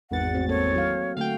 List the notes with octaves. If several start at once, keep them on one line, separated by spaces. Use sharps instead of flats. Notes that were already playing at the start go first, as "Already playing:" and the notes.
G#1 E2 F#5 A6
A3 C4 F#4
A#3 C4 A4 C#5
F#3 F5
D3 A3 F#4 F5 G5